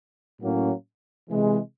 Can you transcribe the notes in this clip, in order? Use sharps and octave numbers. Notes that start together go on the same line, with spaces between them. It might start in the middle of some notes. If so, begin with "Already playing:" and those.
A2 F#3 A#3 C#4
C3 E3 G#3